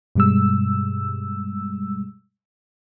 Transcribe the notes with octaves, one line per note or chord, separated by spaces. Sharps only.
G2 B2 G3 G#3 E6